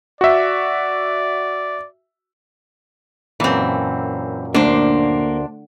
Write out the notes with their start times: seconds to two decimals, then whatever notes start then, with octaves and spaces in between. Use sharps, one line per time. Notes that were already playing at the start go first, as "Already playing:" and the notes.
0.21 F#4 D5 E5
3.40 F#2 A#2 E3 C4
4.54 D2 A#3 D4 C5